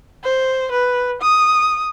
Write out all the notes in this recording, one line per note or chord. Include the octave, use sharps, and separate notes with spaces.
C5
B4
D#6